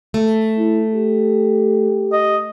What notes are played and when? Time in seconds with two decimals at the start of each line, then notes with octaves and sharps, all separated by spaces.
0.14 A3
0.58 E4
0.94 G4
2.12 D#5